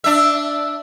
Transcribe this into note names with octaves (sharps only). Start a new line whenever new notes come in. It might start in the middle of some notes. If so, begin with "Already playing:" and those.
D4 E5